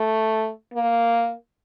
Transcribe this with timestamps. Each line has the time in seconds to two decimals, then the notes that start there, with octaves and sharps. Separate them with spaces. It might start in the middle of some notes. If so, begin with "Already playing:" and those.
Already playing: A3
0.74 A#3